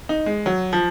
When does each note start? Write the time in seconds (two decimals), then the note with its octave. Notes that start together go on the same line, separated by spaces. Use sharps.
0.09 D#4
0.26 G#3
0.46 F#3
0.73 F3